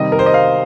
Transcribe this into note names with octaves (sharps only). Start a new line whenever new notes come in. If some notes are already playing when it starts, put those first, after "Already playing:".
Already playing: C3 D#3 G3 D#5
A#4
C5
D#5
F5